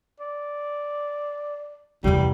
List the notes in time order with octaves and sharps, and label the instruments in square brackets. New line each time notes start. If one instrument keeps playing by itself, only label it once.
[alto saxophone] D5
[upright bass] E2 C3 [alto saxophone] G3